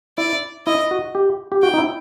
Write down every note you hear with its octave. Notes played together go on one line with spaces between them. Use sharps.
E4 D5
E4 D#5
F#4
G4
G4
F#4 G5
D#4
E4